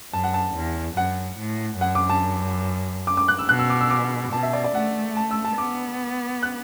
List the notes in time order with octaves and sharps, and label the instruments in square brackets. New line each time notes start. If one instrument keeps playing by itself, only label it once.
[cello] F#2 [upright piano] A5
[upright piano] F#5
A5
[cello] E2
[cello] F#2 [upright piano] F#5
[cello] A2
[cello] F#2 [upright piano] F#5
[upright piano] D6
A5
D6
D6
F#6
E6
[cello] B2 [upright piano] F#6
[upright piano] E6
D6
E6
D6
[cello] B2 [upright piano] A5
[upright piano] E5
D5
D5
[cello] A3 [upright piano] F#5
[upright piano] A5
E6
A5
[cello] B3 [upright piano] D6
[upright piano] F#6